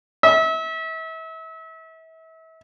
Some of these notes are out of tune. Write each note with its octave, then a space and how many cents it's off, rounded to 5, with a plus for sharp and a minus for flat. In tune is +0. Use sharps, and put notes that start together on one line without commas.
E5 -35